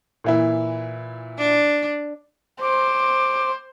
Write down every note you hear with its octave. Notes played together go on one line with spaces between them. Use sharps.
A#2 E3 E4
D4
C5 D6